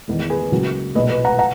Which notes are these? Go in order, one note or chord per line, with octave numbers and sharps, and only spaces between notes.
E2 D#3 G#3
G#4 B4
C#2 C#3 F#3 A#3
B1 A#2 G#3 B4 D#5
B4 D#5
F#5 A#5
F#5 A#5